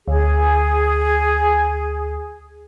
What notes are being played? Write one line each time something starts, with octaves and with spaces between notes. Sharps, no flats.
D2 G#4